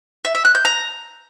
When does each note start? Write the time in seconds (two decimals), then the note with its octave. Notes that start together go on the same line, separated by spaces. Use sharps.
0.25 E5
0.35 E5
0.45 F#6
0.55 G6
0.65 A#5